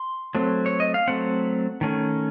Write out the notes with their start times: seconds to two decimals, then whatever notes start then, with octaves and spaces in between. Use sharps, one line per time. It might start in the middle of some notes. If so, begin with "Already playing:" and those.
Already playing: C6
0.35 F#3 A3 C4
0.66 C#5
0.80 D#5
0.94 F5
1.08 F#3 A3 C4 F#5
1.81 D#3 A3 C#4